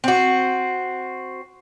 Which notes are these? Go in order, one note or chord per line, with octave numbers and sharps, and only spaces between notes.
C4 F#4